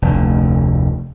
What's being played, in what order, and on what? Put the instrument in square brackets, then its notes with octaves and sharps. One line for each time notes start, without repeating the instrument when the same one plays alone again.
[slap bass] F1 D2